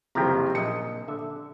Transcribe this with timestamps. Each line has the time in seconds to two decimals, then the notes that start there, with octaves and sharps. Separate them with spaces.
0.15 F#1 C3 F3 E4 G4 A#5
0.55 A#1 D#5 C#7
1.08 D3 E5